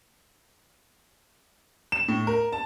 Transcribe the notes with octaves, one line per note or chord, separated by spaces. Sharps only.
E7
A2
A#4
A5